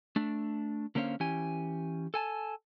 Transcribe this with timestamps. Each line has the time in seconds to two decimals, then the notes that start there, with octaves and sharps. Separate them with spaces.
0.16 A3 D4
0.95 D3 A#3 C#4 C5 C#5 F5
1.20 E3 C#4 G4 G#5
2.14 A4 G#5 A5